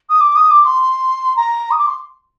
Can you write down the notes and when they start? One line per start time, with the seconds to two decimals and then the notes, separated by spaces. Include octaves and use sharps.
0.09 D#6
0.20 D6
0.36 D#6
0.50 D6
0.65 C6
1.36 A#5
1.71 D#6
1.78 D6
1.87 C6